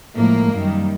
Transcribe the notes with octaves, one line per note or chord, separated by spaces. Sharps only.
A2 F3 G#3 A#3
F#2 D#3 G3